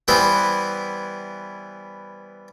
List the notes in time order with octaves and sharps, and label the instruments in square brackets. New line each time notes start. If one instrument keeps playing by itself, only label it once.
[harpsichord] E3 G3 B3 E4 C5